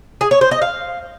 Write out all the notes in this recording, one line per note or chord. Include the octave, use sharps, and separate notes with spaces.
G#4
C#5
C5
D#5
F5